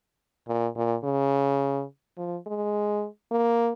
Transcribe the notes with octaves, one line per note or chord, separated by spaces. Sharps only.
A#2
A#2
C#3
F3
G#3
A#3